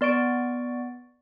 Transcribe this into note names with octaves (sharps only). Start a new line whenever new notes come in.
B3 D5 C#6 D7